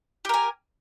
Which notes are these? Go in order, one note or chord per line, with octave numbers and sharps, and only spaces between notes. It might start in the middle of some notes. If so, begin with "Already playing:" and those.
G4 A#4 G#5